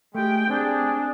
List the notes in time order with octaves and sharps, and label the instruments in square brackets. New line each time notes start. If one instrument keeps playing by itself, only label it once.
[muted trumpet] G#3 [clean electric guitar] A3 G4 [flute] G5
[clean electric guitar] C4 [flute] D4 [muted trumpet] G#4